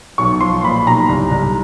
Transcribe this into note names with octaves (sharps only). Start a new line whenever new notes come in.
B1 C#6
F3 C6
A#2 B5
B1 A#5
C2
C2